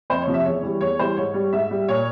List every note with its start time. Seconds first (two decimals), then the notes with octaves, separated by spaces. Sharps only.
0.10 F2 C5
0.22 C#5
0.27 C3 F3
0.34 E5
0.45 E2 C#5
0.63 E3 G3
0.81 E2 C#5
0.99 E3 G3 C5
1.17 G#2 C#5
1.34 G3
1.53 G#2 E5
1.71 G3
1.88 A#2 C#5